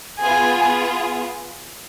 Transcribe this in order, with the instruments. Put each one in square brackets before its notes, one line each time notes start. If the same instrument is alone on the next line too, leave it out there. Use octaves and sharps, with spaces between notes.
[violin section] B3 F4 G#4 [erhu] G#5